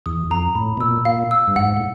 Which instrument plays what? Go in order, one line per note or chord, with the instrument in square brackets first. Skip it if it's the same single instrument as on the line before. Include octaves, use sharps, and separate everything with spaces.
[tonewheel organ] E2 [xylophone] D#6
[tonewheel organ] F2 [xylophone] A#5
[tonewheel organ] A2 [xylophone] B5
[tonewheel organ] B2
[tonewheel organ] A#2 [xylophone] E6
[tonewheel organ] A#2 [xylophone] F5
[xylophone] E6
[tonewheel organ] G2
[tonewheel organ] G#2 [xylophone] F#5
[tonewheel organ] A2